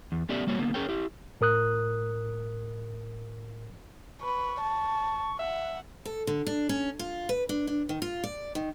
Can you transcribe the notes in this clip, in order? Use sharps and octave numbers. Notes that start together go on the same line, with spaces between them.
E2
A3 B3 C#4 G4 D5 E5
G3 A#3 F#4 C#5
D3 A#3 B3
C#4 G#4 A#4 C#5 G5
E4 G4
A2 A#4 D#6 F#6
B4 C#6
A5
E5 F#5
A4
D3
D4
C#4
F4
B4
D4
D4
D#3
F4
D5
D#3